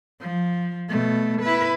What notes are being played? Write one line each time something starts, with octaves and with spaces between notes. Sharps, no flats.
F3
B2 A3
E4 B4